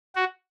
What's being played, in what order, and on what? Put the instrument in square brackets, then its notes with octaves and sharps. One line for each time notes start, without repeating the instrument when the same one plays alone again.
[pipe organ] F#4